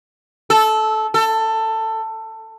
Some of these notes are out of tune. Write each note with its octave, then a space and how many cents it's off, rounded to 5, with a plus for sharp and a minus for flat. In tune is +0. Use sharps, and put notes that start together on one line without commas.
A4 -15
A4 +15